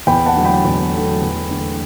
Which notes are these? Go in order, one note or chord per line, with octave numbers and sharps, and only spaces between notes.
E2 G5 B5
F#5 A5
D3 F#3 A3
G5 B5
E2
D3 F#3 A3
E2
D3 A3